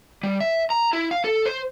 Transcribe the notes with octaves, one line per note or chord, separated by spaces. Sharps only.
G3
E5
A#5
E4
F5
A4
C5